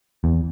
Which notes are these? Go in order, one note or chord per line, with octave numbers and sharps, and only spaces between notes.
E2